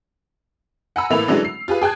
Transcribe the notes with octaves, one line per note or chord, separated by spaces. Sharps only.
F#5 G#5 A#5 B5 E6
A2 E3 A3 A#3 B5 F7
D3 E3 F#3 G#3 C#4 D4
C7
F4 G4 G#4 B4
G#4 G5 A5 F#6 G#6